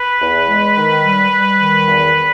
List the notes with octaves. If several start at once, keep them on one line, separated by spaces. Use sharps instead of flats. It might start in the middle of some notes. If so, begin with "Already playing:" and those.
Already playing: B4
E2
G#3
D#3
G3
G3
D#3
E2